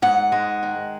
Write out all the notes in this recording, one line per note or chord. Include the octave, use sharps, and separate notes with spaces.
G#2 F#5
G#3
D#3